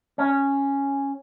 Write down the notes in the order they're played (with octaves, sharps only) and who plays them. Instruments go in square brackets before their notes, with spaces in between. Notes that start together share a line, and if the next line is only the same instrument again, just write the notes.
[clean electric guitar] C#4